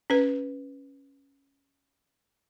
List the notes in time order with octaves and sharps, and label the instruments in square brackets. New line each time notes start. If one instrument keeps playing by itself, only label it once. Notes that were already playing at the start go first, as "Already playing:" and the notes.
[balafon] C#4 B4